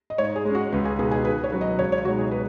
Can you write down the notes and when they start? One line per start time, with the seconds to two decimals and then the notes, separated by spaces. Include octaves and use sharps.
0.10 D#5
0.18 G#2 C#5
0.36 G#4
0.45 G#3 C#4
0.55 F#4
0.72 C#2 B4
0.85 G#4
0.99 B2 B3 D#4 G#4
1.11 G#4
1.25 D#3 B4
1.44 C#5
1.52 F#3 C#4 F#4 B4
1.61 D#5
1.79 C#2 C#5
1.92 C#5
2.05 B2 G#3 D#4 F#4
2.18 G#4
2.31 B4